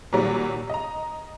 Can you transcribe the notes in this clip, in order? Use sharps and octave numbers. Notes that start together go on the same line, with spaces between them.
A#2 D#3 F#3 G3
D#5 A#5